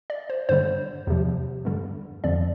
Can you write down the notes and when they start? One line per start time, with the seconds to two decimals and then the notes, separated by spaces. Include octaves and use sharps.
0.10 D5
0.30 C5
0.49 G2 D3 G3 C5
1.07 E2 C3 F3
1.65 G2 D3 G3
2.24 F2 D3 F3 C4 D5